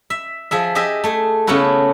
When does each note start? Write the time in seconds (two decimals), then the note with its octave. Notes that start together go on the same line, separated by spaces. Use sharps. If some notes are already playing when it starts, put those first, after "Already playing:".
0.10 E5
0.51 F3 G#4 E5
0.75 G4 G#4 D#5 E5
1.04 A3 G#4
1.47 C#3 A3 B3 C#4 E4 F#4